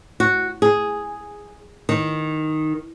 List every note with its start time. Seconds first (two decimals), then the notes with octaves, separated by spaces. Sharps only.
0.20 F#4
0.62 G#4
1.89 D#3